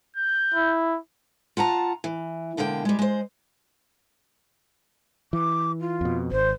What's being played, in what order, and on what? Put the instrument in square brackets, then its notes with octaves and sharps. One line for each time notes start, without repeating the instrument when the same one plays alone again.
[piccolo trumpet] G6
[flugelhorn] E4
[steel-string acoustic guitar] F4 F#5 A5 A#5
E3
B2 D3 G#3 A#3 A4 G5
G3 G#3
G#3 C5
[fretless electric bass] E3 [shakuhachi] D6
[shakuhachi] F4
[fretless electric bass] F2 B2
[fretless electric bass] G#1 [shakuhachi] C5